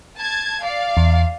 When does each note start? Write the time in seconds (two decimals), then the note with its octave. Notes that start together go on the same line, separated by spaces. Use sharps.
0.18 A5 G#6
0.62 D5 F5
0.97 E2